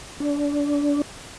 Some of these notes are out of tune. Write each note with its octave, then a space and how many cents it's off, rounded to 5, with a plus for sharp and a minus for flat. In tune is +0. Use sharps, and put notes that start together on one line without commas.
D4 -25